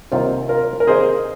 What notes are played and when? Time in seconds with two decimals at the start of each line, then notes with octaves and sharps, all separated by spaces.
0.12 C2 C3 D#3 A#3 C4 D#4 F4
0.49 F4 A#4
0.80 A#4
0.87 C2 C3 D#3 A#3 D#4 G#4 C5